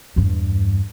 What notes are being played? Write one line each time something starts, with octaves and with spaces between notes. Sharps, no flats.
E2 G2